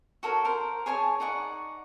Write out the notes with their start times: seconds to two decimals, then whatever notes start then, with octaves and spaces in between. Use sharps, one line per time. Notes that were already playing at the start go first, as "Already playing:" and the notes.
0.23 F#4 A4 A#4 C#5
0.45 A#4 C5
0.86 G#4 C#5 G#5 A5
1.20 D#4 D5 F#5 C#6